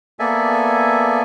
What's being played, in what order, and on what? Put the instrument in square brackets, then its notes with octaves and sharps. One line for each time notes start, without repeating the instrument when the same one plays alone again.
[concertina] A#3 B3 A4 D5 E5 G#5